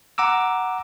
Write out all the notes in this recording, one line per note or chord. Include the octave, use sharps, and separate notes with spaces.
F#5 A#5 D6 E6